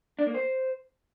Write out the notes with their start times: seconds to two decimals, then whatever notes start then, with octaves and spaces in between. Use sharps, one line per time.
0.19 D4
0.27 A#3
0.34 C5